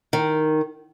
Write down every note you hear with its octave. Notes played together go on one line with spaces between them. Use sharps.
D#3